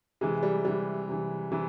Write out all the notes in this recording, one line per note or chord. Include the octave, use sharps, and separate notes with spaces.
C3 E3 G#3
G3
C3 E3 G3
C3 E3
C3 E3